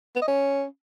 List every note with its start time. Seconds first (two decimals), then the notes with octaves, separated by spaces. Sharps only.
0.16 B3
0.22 D#5
0.28 C#4